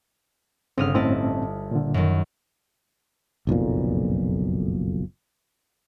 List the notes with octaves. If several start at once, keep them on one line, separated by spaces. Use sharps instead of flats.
G1 C#3 C4 D#6 F6
A2 C4 C#4 E4 D#5 A5
A#2 D3
F#2 D#3
F#1 B1 F2 A#2